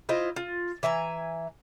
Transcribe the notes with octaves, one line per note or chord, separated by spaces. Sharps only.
E4 F4 C5 D#5
F4
E3 E5 G#5 A#5